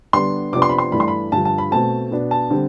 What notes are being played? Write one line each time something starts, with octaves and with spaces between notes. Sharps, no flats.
D3 G3 B3 D4 C6
C3 F3 B3 D4 D6
C6
B5
C6
G2 E3 A3 D4 B5
C6
B5
G2 D3 F3 A5
A5
B5
B2 A3 C4 A5
B2 B3 D4
A5
D3 G3 C4